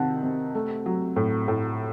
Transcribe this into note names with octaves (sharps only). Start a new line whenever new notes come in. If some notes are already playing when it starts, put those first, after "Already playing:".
Already playing: C3 D#3 F#5 A5
C3
A3
F#3
A2
A2